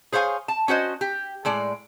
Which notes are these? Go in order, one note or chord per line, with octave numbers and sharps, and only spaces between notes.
G#4 C5 C#5 F5 G#5
A5
C#4 F#4 C5 D#5
G4
A2 G#3 D5